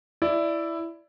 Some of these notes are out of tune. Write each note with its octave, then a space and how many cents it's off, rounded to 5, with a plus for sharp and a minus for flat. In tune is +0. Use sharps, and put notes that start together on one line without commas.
E4 +10 D5 +0